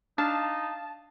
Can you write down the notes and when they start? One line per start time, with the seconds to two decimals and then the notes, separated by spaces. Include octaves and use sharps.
0.18 D4 D#4 F5 A5